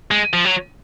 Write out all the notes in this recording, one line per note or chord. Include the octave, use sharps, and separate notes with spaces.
G#3
F3
F#3